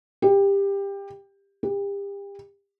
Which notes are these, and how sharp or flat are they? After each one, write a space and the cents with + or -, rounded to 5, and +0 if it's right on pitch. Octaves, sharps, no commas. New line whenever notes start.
G4 +20
G4 +35